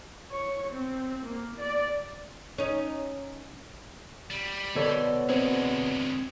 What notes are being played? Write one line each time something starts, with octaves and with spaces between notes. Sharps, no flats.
C#5
C4
A#3
D5
C#4 D#4
G3
B2 A4 C#5 D5
D2 G#3 C4